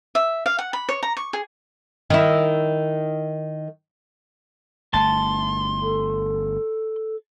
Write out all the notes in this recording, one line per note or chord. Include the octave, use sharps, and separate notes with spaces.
E5
F5
F#5
B5
C#5
A#5
C#6
G#4
D#3 E4
G1 A3 A5 C6
A4